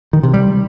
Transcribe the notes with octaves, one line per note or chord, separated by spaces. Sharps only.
D#3
C3
G3